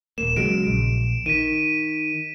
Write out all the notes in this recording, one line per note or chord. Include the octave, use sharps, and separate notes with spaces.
D#1 A#3 E7
C#3 F#3 G#3 D7
A#1
D#3 B6 D#7